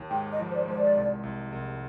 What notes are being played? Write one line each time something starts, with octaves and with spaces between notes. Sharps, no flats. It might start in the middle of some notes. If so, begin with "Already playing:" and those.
Already playing: D#2
G#2 G5
D#5
F3
C5
D5
G#3 C5
D5
C2
C2
C2